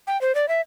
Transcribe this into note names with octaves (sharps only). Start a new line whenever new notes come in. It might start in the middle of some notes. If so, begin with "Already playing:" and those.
G5
C5
D5
E5